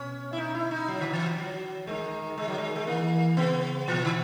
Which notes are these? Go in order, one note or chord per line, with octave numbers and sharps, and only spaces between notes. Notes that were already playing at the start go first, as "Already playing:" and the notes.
Already playing: B2 C#4
E4
D#4
E4
D#4
F#3
D#3
E3
F#3
F#3
D#3 G#3
G#3
F#3
G#3
G#3
E3 A#3
C#3 B3
B2 E3
D#3